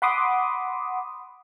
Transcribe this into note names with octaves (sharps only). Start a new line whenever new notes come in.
F#5 B5 C6 D6 D#6